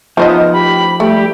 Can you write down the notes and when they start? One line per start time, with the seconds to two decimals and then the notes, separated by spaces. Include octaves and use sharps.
0.17 E3 F3 B3 D#4 C5 D#5
0.53 A1 G4 B5
1.00 E3 G3 A3 G4